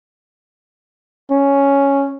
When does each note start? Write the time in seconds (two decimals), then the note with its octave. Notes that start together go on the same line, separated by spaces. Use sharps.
1.31 C#4